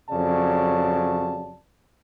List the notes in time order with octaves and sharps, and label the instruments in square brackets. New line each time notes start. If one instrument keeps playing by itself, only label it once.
[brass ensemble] F2 C#3 F#3 D5 A5